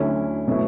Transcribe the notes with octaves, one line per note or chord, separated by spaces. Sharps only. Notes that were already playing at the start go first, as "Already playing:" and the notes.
Already playing: D2 D3 F#3 C#4 E4
B2 F#3 A3 E4